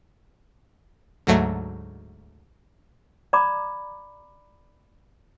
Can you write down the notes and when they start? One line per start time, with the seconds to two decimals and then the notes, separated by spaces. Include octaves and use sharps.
1.27 D2 G#2 F#3 A3
3.33 D5 A#5 B5 D6